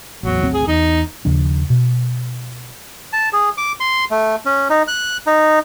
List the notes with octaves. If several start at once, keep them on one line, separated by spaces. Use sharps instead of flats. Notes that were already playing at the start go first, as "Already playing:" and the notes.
A1 E2 F#3
G#1 D2 C4
G#4
E2 D#4
D#2 C#3 F3 D4
B2
A5
G#4
D6
C6
A3
C#4
D#4
F#6
D#4